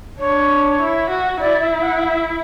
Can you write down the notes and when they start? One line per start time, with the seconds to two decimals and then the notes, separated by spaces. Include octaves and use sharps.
0.19 D4 C#5
0.80 E4
1.10 F#4
1.40 E4 D5
1.60 E5
1.81 F#5
2.00 F#5
2.04 E5